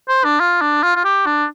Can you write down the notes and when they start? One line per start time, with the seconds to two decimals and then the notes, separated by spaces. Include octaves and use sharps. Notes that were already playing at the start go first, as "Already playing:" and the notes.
0.08 C5
0.24 D4
0.40 F4
0.61 D4
0.83 F4
0.96 F4
1.04 G4
1.26 D4